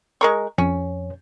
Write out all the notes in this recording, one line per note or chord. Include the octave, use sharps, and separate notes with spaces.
G#3 A#4 C#6
F2 C#4